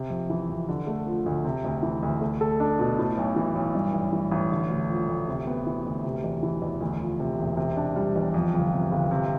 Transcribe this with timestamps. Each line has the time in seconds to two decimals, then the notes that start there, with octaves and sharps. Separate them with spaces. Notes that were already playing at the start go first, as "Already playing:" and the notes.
Already playing: C3
0.10 F2
0.30 E3
0.49 F2
0.69 D3
0.87 A3
1.07 F3
1.26 D2
1.45 C3
1.64 D2
1.83 E3
2.03 D2
2.22 A3
2.41 A4
2.60 D4
2.79 B2
2.98 A2
3.17 B1
3.36 E3
3.55 B1
3.75 G2
3.94 A1
4.13 E3
4.31 A1
4.51 D3
4.70 D2
4.89 F3
5.08 D2
5.28 C3
5.47 B3
5.66 E3
5.85 D2
6.04 C3
6.24 E2
6.43 E3
6.62 E2
6.80 D2
7.00 F3
7.20 C3
7.39 E1
7.57 C3
7.77 D4
7.96 G3
8.16 E2
8.34 F2
8.54 G1
8.73 C3
8.92 G1
9.11 C3